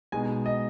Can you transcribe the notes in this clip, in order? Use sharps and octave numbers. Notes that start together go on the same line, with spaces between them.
B2 G#3 B3 D#4 G#5
D#5